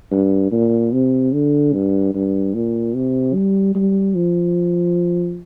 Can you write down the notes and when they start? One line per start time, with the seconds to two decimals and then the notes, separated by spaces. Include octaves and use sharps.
0.12 G2
0.51 A#2
0.93 C3
1.33 D3
1.73 G2
2.14 G2
2.54 A#2
2.95 C3
3.34 G3
3.75 G3
4.15 F3